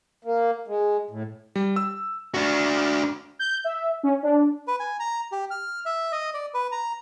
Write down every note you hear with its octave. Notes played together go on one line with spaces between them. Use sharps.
A#3
G#3
A2
G3
E6
D4 F#4
G6
E5
C#4
D4
B4
G#5
A#5
G4
F6
E5
D#5
D5
B4
A#5